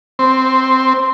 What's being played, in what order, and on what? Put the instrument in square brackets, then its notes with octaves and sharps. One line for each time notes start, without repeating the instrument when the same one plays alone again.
[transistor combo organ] C4